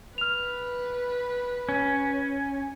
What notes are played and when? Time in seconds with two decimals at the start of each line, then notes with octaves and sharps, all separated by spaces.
0.18 B4 F6 F7
1.69 C#4